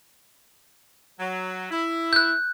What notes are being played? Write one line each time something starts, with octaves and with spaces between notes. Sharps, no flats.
F#3
E4
F#6 G6